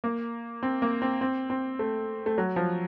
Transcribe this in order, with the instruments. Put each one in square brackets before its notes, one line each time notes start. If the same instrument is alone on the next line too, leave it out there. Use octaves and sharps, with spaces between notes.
[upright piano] A#3
C4
A#3
C4
C4
C4
A3
A3
F#3
F3